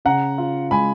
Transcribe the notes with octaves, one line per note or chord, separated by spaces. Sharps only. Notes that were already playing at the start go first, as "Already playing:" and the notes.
C#3 F#5 A#5
F4
G#3 G#5 B5